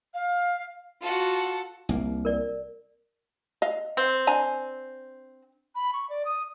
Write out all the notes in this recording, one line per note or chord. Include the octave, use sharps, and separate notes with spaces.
F5
F4 F#4 A4 F#5
C2 A#3
A#4 D5
D#5 F5
C4
D4 G#5 A#5
B5
C#6
D5
D#6